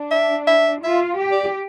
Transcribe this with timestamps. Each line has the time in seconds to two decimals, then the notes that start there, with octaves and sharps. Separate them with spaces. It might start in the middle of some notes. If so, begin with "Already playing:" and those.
Already playing: D4
0.11 E5
0.47 E5
0.83 F4 E5
1.19 G4
1.31 D5